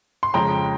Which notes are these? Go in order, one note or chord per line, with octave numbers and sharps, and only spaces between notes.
C6
F2 C#3 G#3 G5 A#5